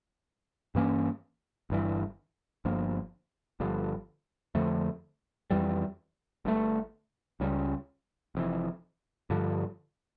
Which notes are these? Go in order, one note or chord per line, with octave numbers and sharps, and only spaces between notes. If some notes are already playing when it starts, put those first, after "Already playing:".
G2 E3 A#3 C#4
G1 G2 E3
G1 G2 F3 A#3
G1 G2 D3 F3
F2 D3 F3 A3
F2 E3 G3
G1 G2 D3 A3
C#2 C#3 G3 C#4
F1 F2 E3
G2 D3 F3